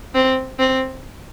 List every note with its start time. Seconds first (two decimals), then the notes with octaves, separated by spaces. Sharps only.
0.15 C4
0.59 C4